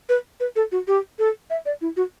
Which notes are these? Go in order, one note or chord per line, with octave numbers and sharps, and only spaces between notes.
B4
B4
A4
F#4
G4
A4
E5
D5
E4
F#4